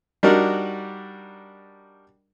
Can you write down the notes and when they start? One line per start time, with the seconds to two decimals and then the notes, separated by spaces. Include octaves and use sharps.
0.23 G3 D4 D#4 F#4 A#4